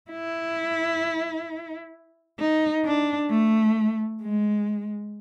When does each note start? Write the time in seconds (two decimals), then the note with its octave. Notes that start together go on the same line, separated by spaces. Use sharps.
0.11 E4
2.39 D#4
2.85 D4
3.30 A3
4.22 G#3